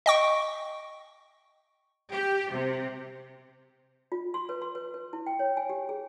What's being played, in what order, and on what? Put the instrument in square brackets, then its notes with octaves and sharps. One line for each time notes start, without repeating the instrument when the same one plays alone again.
[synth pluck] D#5 G5 C#6
[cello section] G4
C3
[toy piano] F4
C6
B4
C6
B4
B4
E4
G5
C#5
G#5
G4
G#4